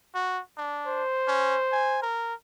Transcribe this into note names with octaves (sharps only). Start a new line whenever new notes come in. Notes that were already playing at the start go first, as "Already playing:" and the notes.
F#4
D4
C5
C#4
G#5
A#4